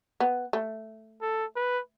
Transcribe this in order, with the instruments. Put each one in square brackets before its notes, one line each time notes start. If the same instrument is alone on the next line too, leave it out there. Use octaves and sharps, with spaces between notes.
[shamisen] B3
A3
[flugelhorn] A4
B4